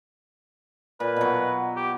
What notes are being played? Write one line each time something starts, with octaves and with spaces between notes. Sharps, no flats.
A#2 B4
B2 F#3
G4